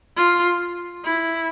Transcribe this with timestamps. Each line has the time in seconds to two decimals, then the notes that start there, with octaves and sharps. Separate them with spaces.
0.17 F4
1.05 E4